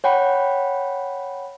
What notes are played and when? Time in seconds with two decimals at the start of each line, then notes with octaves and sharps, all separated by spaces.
0.04 C#5 F#5 G5 B5